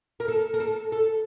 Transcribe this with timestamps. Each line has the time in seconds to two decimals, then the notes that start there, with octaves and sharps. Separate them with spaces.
0.20 A#4
0.28 A4
0.54 A#4
0.60 A4
0.92 A4